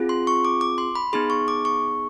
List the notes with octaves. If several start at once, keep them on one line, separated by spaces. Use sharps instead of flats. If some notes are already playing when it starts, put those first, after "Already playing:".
Already playing: C4 F4 G#4
C6
C#6
D6
D6
C6
B5
B3 D#4 G#4 C6
C#6
D6
C#6